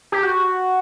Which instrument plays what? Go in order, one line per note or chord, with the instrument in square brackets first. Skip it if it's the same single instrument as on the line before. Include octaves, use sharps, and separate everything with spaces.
[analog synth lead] G4
F#4